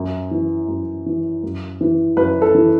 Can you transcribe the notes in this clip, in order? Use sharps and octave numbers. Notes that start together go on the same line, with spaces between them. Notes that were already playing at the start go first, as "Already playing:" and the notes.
Already playing: F#2
E3
F#2
E3
F#2
E3
F#2 B4
A4
E3